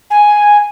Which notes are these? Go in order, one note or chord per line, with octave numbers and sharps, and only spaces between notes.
G#5